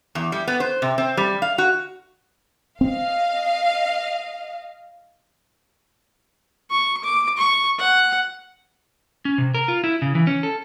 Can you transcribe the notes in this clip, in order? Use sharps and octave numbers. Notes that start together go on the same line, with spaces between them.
E2
G3
B3
C5
C3
C4
G3
F5
F#4
C4 D#5 F5
C#6
D6
C#6
F#5
C#4
C3
A#4
F4
E4
C#3
E3
C#4
A4